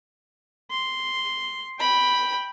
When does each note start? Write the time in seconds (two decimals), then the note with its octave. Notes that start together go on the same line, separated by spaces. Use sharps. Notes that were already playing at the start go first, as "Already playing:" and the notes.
0.71 C6
1.80 G5 B5